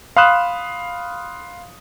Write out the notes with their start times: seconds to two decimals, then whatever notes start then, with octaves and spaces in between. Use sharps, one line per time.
0.16 F5 B5 C6 D#6 F#6 E7